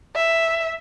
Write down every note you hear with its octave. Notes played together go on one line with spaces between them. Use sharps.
E5